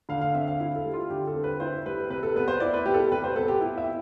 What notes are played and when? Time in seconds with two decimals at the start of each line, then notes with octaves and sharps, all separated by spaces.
0.09 D3 F5
0.22 F5
0.34 C4 E5
0.47 F5
0.60 E4 F5
0.76 A4
0.85 G3
0.94 F4
1.10 D3 G4
1.27 A4
1.35 C4
1.44 B4
1.60 E4 C5
1.86 G3 B4
2.10 C3 B4
2.23 A4
2.36 B3 B4
2.48 C5
2.60 E4 D5
2.73 B4
2.85 G3 G4
2.94 A4
2.99 G4
3.11 C3 B4
3.24 C5
3.36 B3 A4
3.48 G4
3.61 E4
3.78 E5